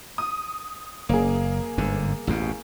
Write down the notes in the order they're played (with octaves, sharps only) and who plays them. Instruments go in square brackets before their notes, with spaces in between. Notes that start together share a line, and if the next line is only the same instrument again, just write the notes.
[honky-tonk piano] D#6
[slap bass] F#1 [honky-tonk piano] A#3 G#4
[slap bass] G1 G#2 D3
A1 E2 B2